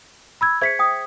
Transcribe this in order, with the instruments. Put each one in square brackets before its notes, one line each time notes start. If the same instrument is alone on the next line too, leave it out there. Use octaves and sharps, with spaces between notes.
[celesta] B5 E6 G#6
[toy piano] G#4 C5 E5 [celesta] G#6 B6 C#7
[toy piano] G5 D#6